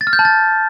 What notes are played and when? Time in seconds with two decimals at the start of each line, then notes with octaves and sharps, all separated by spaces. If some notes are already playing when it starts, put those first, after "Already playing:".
0.01 A6
0.07 F6
0.13 G6
0.19 A5
0.25 A6